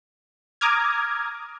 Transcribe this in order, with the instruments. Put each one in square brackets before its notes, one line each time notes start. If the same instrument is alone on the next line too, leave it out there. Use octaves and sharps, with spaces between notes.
[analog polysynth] A#5 D6 D#6 F6 G#6